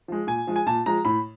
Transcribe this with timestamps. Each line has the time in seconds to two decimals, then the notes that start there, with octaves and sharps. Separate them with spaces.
0.08 F3 G#3
0.27 A#2 G#5
0.47 F3 G#3
0.56 G#5
0.67 A#2 A5
0.86 F3 G#3 A#5
1.05 A2 B5